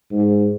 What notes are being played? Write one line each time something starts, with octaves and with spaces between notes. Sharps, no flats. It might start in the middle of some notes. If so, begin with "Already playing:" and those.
G#2